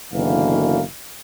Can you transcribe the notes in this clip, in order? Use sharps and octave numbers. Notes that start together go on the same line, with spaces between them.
F#1 B2 D3 E3 A#3 F5